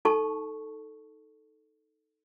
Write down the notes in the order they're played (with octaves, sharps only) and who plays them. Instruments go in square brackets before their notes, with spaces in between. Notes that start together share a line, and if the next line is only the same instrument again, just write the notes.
[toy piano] D#4 A4 A5 C#6